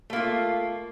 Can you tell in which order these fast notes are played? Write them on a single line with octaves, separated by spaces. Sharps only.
A3 A#3 F4